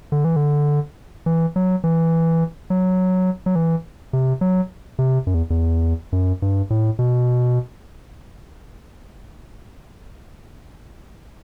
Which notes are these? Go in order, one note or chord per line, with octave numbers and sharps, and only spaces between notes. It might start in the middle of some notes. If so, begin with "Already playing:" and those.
D3
E3
D3
E3
F#3
E3
F#3
F#3
E3
C3
F#3
C3
F#2
E2
E2
F#2
G2
A2
B2